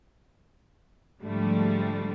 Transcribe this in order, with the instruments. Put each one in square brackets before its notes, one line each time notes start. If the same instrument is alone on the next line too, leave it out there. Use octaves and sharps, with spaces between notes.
[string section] G#2 D3 F3 G3 A3